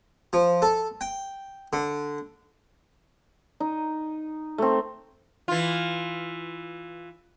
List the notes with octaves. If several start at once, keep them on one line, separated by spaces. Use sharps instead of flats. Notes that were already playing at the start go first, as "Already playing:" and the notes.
F3
A4
G5
D3
D#4
A3 C4
E3 F4